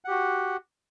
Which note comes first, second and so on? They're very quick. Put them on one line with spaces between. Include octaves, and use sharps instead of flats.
F#5 G4 F#4